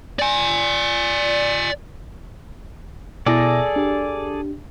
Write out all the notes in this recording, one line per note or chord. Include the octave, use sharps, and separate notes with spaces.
D5 G#5
B2 E4 G#4 A4 D5 A#6
D4 G4